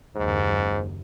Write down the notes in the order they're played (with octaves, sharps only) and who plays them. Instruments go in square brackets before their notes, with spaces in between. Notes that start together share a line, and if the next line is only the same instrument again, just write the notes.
[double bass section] F#1 D#2 [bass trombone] G#2